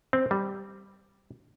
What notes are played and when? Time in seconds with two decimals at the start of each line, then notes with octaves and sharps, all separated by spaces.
0.13 C4
0.31 G3